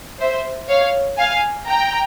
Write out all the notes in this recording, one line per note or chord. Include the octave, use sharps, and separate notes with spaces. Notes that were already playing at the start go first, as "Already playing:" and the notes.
C5 E5
C#5 F5
F5 G#5
G5 A#5